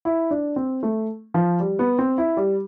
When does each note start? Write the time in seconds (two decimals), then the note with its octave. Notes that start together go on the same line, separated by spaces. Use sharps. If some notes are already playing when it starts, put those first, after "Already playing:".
0.05 E4
0.31 D4
0.56 C4
0.83 A3
1.34 F3
1.60 G3
1.79 B3
1.99 C4
2.18 E4
2.37 G3